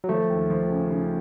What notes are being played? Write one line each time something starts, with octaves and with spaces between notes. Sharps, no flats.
F#3
F3 A3
D#2
F3
C#3
C#3